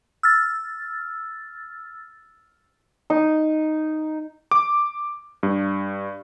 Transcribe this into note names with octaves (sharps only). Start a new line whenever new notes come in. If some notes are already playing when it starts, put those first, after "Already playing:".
E6 F6 A6
D#4
D6
G2